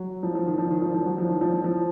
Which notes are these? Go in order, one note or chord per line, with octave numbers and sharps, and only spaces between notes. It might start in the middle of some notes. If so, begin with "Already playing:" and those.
Already playing: F#3
F3
F3
D#3
F3
D#3
F3
F3
F#3
F3
D#3
F3
F3
F3